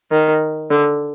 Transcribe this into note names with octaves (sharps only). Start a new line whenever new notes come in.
D#3
D3